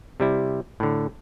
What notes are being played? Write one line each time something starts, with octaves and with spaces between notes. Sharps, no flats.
C3 G3 E4
A2 D3